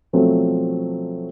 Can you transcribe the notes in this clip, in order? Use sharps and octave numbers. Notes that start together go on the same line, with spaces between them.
B2 F3 F#3 A3 C4